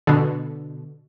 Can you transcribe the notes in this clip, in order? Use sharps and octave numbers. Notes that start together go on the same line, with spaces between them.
B2 D3